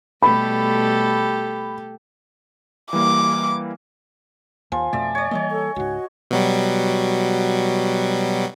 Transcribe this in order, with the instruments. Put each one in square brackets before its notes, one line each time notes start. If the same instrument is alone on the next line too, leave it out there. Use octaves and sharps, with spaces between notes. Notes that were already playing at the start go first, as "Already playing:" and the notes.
[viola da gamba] B2 G3 A3 [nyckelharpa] G4 A4 [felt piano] B5
[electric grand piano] E3 G3 A#3 [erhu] D6
[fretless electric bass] D#2 [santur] F3 [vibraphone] G#5
[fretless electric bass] F2 B2 A3 [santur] D5 E5
[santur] C#5 D5
[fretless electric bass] E3 G3 A#3 [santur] C#5 D#5
[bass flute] A4
[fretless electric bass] C#2 G#2 [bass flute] F#4
[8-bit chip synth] B2 F#3 G3